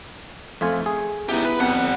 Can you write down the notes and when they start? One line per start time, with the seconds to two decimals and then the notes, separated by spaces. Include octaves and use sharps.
0.61 F2 A3 F4 G#5
0.86 G#4
1.29 B3 D#4 E4 G4
1.45 B4
1.60 F2 G3 B3 F#5